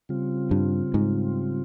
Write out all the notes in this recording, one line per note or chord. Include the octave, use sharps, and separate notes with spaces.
C#3 G3 C4 F4
G2
G#2